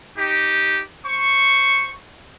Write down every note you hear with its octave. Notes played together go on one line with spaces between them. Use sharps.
D#4 G4
C5 C#6